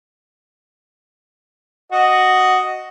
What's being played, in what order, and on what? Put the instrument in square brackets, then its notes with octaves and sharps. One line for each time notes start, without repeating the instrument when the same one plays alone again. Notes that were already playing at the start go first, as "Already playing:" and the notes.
[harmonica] F#4 D#5